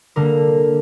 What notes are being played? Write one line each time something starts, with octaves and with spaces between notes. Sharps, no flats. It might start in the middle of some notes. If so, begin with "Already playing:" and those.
D3 G3 A#3 A#4